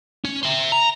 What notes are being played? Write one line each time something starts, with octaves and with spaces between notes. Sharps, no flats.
C#4
C5 E5
A#5